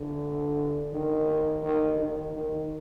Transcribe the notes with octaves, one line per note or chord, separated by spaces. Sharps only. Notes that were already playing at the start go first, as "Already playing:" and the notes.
Already playing: D3
D#3
D#3
D#3
D#3